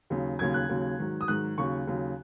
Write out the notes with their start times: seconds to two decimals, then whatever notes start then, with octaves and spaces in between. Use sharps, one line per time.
0.10 D#2 C#3 F#3
0.39 D#2 C#3 F#3 G#6
0.54 F#6
0.69 D#2 C#3 F#3
0.99 G#2 D#3 F#3
1.21 D#6
1.28 G#2 D#3 F#3 F#6
1.58 D#2 C#3 F#3 C#6
1.87 D#2 C#3 F#3